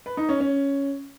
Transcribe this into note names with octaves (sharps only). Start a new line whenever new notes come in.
B4
D#4
C#4
C#4